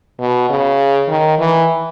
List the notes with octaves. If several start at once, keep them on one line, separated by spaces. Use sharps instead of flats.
B2
C#3
D#3
E3